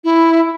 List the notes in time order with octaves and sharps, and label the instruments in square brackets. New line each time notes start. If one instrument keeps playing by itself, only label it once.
[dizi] E4